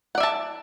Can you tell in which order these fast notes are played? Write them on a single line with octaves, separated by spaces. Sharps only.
F#5 D5 E5 A5